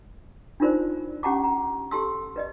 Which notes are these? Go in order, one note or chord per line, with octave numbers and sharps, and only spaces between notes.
D4 D#4 F4 A#4 C5 D5
C#4 G4 F#5 A5 A#5 D6
A#5
G4 A4 A5 C6 E6
B4 D5 D#5